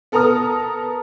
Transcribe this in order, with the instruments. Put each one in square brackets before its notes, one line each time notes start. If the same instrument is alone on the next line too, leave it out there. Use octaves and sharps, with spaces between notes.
[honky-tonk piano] B3 A4 A#4 A#5 D#6 F6